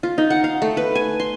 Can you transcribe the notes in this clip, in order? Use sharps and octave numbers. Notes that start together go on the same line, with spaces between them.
F4
D#4
F#5
F5
A3
B4
G#5
C6